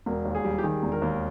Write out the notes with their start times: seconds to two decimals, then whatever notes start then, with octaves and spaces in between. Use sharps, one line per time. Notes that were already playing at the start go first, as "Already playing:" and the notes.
0.06 E1 A#4
0.25 D#2
0.35 G#4
0.45 G3
0.58 G4
0.63 D#3 G#4
0.83 E1
0.92 A#4
1.02 D#2